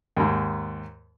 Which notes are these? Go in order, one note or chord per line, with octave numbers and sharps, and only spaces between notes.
D#2 G#2